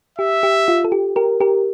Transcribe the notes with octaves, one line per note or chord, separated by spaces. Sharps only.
G4 E5
G4
F4
A4
G4
G4 A#4
G4 A#4